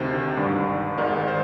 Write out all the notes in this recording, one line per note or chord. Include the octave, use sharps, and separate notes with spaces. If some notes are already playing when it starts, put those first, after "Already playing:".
Already playing: D2 C3 D#3 C5
G#1 G2 D#3 D5
G#1 G#2 D#3 D5
C5